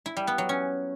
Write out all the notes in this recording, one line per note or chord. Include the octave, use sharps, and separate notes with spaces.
E4
G3
B3
F#3
C#4